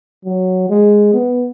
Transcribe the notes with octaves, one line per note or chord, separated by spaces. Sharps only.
F#3
G#3
B3